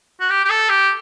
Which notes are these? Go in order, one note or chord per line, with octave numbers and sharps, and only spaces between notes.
F#4
G4
G4
A4
G4